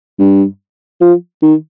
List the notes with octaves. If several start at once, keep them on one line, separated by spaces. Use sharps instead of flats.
G2
F3
D#3